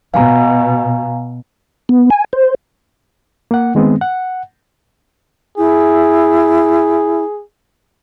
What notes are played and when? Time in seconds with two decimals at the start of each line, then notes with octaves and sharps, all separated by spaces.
0.14 B2 F5 G#5 A#5
1.89 B3
2.10 G#5
2.33 C5
3.51 A#3 F#5
3.75 D#3 G#3 B3 C4
4.01 F#5
5.58 E4 G#4